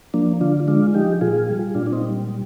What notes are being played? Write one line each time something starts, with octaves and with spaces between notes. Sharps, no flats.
F3 A#3 D4
D3 D4 F4
G#3 D4 F4
F3 D#4 G4
A#2 F4 G#4
G3
A#2 D4 F4
D4
C4 D#4
G3
G3